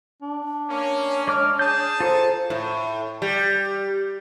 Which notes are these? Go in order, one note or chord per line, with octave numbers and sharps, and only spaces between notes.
D4
A#3 C#4 C#5
G#3 D6 F6
G#4 A5 D#6 G6
F4 A4 C5 A#5
A2
G3